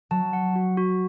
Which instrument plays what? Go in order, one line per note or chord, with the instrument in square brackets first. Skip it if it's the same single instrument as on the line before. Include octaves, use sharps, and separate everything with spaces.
[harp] F#3 [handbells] A5
[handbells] F#5
F#4
F#4